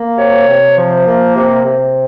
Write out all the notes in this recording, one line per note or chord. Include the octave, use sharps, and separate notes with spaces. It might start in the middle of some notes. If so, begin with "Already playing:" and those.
Already playing: A#3
C3 C#5
C3
F3
A#3
C3
C3